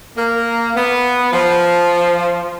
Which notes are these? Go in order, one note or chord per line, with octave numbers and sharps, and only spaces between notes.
A#3
B3
F3